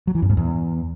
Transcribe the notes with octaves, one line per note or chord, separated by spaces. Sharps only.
F#3
E3
F#2
G#2
E2